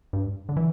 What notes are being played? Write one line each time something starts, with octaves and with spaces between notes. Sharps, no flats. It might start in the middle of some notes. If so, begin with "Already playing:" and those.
G2
D3
E3